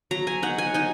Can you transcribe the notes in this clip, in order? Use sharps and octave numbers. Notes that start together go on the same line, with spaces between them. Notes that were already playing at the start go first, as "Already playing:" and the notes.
F#3 A#5
G#5
D#4 F#5
G#5
D#4 G#5